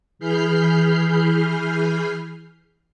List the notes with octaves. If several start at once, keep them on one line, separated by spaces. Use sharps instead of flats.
E3 G#4 B5 F6 G6 C7